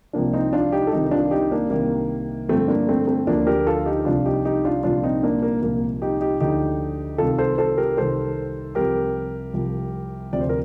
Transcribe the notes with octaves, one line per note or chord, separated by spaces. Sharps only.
C2 C3 F3 A#3 D4
C4 D#4
D4 F4
D#4 G4
A4
C2 C3 D#3 D#4 G4
D#4
D4 F4
D#4 G4
A#3 D4
C2 C3 D#3 A#3
G2 D3 F3 A3 C4
A#3 D4
A3 C4
A3 C4
D2 D3 F3 A#3 D4
G4 A#4
F4 A4
D#4 G4
C2 C3 F3 D4 F4
D#4 G4
D#4 G4
D4 F4
C2 A#2 F3 D4 F4
C4 D#4
A#3 D4
A#3
C2 A#2 F3 A#3
D#4 G4
D#4 G4
D2 D3 F3 D#4 G4
C2 C3 D#3 F4 A4
A4 C5
A4 C5
G4 A#4
C2 C3 D#3 A4 C5
C2 C3 F3 G4 A#4
C2 C3 F3
D2 C3 F3 D5
C5
A#4